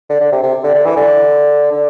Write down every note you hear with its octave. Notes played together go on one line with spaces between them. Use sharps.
D3
D3
C3
C3
D3
D3
E3
D3
D3